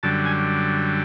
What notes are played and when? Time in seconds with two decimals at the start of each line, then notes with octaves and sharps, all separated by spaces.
0.03 F#2 D3 G3 A5
0.25 G#5